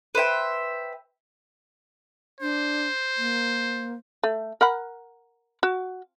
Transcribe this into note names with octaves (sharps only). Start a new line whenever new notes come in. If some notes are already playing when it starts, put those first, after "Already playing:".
B4 C5 E5 G5
D4 C5
A#3
A3
A#4 F#5 B5
F#4